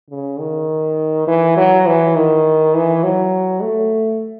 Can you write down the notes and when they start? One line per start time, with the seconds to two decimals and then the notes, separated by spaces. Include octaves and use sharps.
0.10 C#3
0.40 D#3
1.28 E3
1.57 F#3
1.87 E3
2.16 D#3
2.75 E3
3.04 F#3
3.62 A3